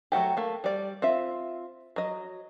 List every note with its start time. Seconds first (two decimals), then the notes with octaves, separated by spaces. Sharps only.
0.12 F#3 A3 F#4 G4
0.37 A3 A#3
0.64 G3 D5
1.02 C4 F4 E5
1.96 F#3 D#5